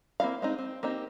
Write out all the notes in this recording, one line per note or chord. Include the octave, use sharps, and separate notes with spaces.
A#3 C4 E4 D#5 F5
G#3 C4 D#4
C4
A#3 C4 D#4 G4